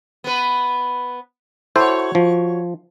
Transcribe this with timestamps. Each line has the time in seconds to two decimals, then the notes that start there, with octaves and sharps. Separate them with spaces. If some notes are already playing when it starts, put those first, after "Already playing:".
0.24 B3 B4
1.76 E4 F#4 A4 C5 C#5
2.15 F3